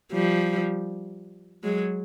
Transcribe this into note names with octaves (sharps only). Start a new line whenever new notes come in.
F3 G3
F#3 G#3